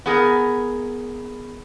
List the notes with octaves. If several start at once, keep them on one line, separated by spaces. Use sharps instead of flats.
B3 G#4 A#4